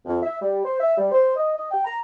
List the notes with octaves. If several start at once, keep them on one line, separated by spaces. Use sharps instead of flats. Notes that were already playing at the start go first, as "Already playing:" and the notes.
F2
E5
G3
C5
E5
G3
C5
D#5
D#5
G5
A#5